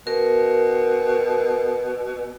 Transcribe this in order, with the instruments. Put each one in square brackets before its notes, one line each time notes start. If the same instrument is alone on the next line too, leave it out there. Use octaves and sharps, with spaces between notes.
[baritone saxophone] B2 [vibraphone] A#4